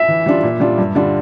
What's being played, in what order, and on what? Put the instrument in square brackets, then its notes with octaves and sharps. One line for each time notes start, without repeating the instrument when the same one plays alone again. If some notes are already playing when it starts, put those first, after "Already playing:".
Already playing: [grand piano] E5
[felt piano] E3
G3 D4 F4
A#2
G3 D4 F4
G2
D3 G3 D4 F4